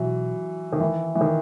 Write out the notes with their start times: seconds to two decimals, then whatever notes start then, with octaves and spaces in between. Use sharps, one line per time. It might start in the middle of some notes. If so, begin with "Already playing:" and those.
Already playing: B2 E3 F#3
0.73 D#3
0.80 E3
1.15 E3
1.21 D#3